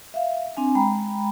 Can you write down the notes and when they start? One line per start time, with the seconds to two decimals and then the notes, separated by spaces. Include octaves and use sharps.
0.14 E5 F5
0.57 C4 D4 G#5
0.75 G#3 G5 A#5 B5